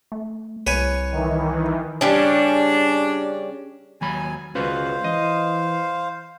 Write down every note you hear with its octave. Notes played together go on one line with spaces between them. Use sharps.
A3
C2 B4 C#5 G#5
D#3 E3
C#3 G3 C#4 D4
D#2 F#3 G#5 B5
C#2 C#4 F#4 B4 C5 F5
E3 D#5